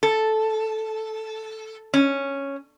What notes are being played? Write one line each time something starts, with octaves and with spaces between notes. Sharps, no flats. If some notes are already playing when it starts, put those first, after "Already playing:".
A4
C#4